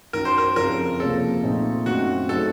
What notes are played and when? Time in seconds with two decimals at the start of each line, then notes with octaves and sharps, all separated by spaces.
0.13 F#2 D#3 F#3 A#4
0.25 C5
0.38 A#4
0.56 F2 C#3 F3 A#4
1.00 C#2 C3 F3 A#3 A4
1.43 A#2 A3 C4 D#4
1.86 F#2 D#3 A3 C4 F#4
2.29 C#3 F#3 A3 D#4 A4